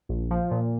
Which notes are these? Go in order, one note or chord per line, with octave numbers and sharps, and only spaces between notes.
A#1
F3
A#2